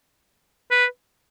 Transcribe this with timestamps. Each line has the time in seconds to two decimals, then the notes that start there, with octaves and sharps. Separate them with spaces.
0.71 B4